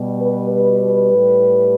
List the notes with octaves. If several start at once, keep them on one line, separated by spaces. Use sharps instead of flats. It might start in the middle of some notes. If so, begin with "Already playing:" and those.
Already playing: B2 G3
B4
B4
B4
A2 G3